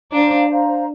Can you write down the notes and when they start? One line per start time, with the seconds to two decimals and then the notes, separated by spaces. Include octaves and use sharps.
0.12 D4 C5 F5 A#5
0.49 C5 F5 A#5